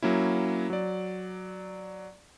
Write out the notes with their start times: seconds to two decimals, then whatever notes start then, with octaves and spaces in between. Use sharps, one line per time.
0.02 F#3 A#3 C#4 E4
0.70 F#3 D5